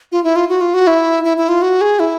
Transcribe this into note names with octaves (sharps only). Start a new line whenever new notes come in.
F4
E4
F4
F#4
F4
F#4
E4
E4
E4
F4
F#4
G#4
E4